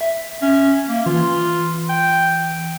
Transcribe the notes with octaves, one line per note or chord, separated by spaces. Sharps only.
E5
C#4 E5
A#3
E3 F4
G5